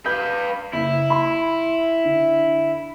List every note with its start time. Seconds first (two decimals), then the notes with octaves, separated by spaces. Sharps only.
0.06 B4 F5 G6
0.73 F#1 E4
1.10 B5 C6
2.05 D3